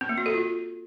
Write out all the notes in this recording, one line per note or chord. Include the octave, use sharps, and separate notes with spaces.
C4
A#3
F#4
A4
F4